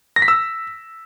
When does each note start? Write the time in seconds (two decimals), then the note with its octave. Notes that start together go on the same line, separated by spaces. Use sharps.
0.16 A#6
0.22 B6
0.28 E6